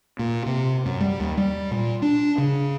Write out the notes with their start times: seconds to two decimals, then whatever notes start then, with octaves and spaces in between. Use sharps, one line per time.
0.19 A#2
0.46 C3
0.86 F#2
1.01 G3
1.20 D#2
1.37 G3
1.71 A#2
2.02 D4
2.38 C#3